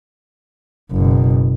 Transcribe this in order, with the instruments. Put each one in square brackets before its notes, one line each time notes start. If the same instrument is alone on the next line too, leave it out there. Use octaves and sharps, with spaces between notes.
[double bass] F#1 B2